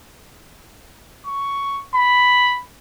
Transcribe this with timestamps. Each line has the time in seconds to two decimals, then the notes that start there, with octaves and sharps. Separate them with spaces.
1.27 C#6
1.95 B5